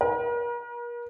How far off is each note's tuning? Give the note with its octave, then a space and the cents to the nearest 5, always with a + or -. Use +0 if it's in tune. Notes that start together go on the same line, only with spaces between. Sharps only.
A#4 +40